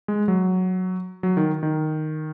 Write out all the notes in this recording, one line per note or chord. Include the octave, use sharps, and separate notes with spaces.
G#3
F#3
F#3
D#3
D#3